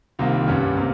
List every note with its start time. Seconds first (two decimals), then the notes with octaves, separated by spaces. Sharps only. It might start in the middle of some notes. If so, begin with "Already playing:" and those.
0.19 C2 C3 D#3 A#3 F4
0.47 G2 G3 C#4
0.77 C3 G3 A#3